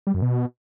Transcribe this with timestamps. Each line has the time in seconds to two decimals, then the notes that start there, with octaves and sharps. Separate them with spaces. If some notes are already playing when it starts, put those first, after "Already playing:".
0.07 G3
0.14 F#2
0.22 B2